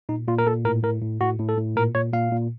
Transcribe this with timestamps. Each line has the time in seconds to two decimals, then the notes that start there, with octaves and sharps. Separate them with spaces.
0.09 A#2 D#4
0.28 A#2 F4
0.38 A#4
0.47 A#2 A4
0.65 A2 A#4
0.83 A2 A#4
1.02 A2
1.21 A2 F#4
1.39 A2
1.49 A4
1.57 A2
1.76 A#2 A#4
1.95 A#2 C#5
2.13 A#2 F5
2.32 A#2